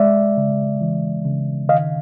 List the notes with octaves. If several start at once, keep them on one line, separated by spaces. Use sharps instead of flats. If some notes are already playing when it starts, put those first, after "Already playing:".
Already playing: G#3 D5 E5
C#3
E3
C#3
D#3 D#5 F5